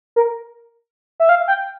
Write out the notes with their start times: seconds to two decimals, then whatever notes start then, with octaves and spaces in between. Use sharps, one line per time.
0.16 A#4
1.20 E5
1.29 F5
1.48 G5